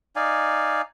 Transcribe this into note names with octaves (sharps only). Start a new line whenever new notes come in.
D#4 D5 F5 G#5